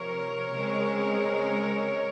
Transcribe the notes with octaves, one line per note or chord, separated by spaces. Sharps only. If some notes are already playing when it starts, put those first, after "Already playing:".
Already playing: C3 F3 C4 A#4 C#5
C#3 G#3 C4